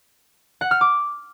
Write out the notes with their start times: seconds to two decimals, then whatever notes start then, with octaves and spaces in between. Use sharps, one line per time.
0.61 F#5
0.71 F6
0.81 D6